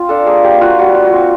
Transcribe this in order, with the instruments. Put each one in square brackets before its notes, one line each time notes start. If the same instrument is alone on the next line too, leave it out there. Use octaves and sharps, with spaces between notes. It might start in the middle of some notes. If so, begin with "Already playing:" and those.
Already playing: [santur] C4 F4
D4 A4
A#3 G#4
A#3 G4
F4 F#4
G3 F#4
F4
F#4
C4